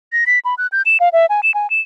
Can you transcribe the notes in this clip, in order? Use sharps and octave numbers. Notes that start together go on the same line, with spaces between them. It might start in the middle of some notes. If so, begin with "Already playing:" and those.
A#6
B6
B5
F#6
G6
E7
F5
E5
G#5
E7
G#5
E7